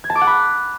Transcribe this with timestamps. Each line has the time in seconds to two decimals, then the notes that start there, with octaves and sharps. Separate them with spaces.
0.04 G#6
0.10 A5
0.16 D6
0.21 F#5
0.27 B5